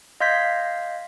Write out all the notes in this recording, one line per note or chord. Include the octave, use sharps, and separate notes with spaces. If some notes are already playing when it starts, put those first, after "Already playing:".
D#5 F5 C6 G6 G#6 B6